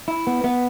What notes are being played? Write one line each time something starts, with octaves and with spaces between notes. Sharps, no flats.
E4
B3
B3